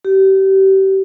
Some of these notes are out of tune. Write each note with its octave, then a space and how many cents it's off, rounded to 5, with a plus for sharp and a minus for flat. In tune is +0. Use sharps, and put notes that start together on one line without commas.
G4 -30